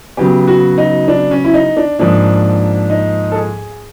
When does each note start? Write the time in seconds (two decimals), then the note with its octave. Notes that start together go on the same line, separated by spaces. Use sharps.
0.17 C#3 F#3 B3 G4
0.48 F#4
0.78 D#4
1.08 D4
1.31 C#4
1.44 E4
1.54 D#4
1.77 D4
1.99 G#2 F3 A#3 D4
2.90 D#4
3.32 A4
3.36 G#4